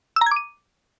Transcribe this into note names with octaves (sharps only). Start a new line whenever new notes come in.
E6
A#5
G#6
D6
D#7